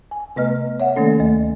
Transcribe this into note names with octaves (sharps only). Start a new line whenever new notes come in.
G#5
C3 A3 B3 B4 D#5 F6
C#5 E5 F#5
D#3 A3 A#3 C#4 A4
D2 A3